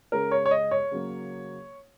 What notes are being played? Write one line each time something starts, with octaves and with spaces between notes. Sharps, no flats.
C#3 G#3 A#4
C#5
C#5
D#5
C#5
C#3 F#3 A#3